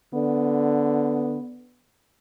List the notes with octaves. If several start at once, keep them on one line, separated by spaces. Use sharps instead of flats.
D3 B3